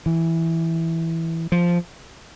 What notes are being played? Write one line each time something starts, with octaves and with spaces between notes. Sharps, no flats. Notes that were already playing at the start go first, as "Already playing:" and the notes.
E3
F3